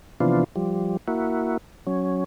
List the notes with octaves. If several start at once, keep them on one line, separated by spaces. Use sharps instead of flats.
C3 E3 F3 B3 D4 F4
F3 G3
A#3 E4 F#4
F#3 C#4